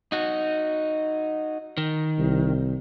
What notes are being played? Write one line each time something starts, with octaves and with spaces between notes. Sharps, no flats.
D#4 F#4
D#3
C2